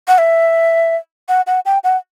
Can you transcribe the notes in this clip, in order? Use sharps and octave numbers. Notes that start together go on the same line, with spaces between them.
F#5
E5
F#5
F#5
G5
F#5